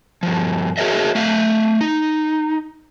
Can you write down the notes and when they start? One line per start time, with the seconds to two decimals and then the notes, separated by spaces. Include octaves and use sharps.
0.23 G2 F3
0.78 F#4 G#4 A#4 C#5 D#5 E5
1.15 A3 E5 F5
1.81 D#4